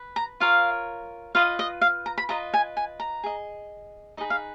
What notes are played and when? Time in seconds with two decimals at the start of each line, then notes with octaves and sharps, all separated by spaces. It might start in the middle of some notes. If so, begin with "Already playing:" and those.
Already playing: B4
0.16 A#5
0.40 F4 A#4 C#5 F5
1.35 F4 B4 D#5 F5
1.59 D#5
1.81 F5
2.06 A#5
2.18 B5
2.29 F4 B4 D#5 A#5
2.54 G#5
2.77 G#5
3.00 A#5
3.24 G#4 D#5
4.17 D#4 G#4 B4 D#5
4.30 F5